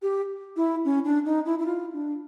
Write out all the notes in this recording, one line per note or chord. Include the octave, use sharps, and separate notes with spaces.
G4
E4
C#4
D4
D#4
E4
E4
F4
D4